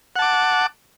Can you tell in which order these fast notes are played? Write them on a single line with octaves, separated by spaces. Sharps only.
F#5 A5 D6